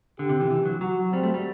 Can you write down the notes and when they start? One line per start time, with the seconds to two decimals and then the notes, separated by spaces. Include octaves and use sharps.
0.19 D3 G4
0.29 C3
0.40 E3
0.51 E3
0.66 F#3
0.81 F#3 F#4
1.12 G3 C4
1.23 A3
1.34 G3